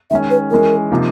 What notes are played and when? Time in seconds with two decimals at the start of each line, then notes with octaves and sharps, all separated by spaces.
0.11 D#3 G#3 C#4 E5
0.30 B4
0.51 E3 G#3 C#4 A#4
0.90 C3 F3 A#3 D#4